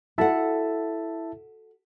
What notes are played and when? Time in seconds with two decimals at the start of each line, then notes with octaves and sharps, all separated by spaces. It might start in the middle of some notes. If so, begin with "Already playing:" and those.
0.18 E4 F#4 A4 E5 F#5 A5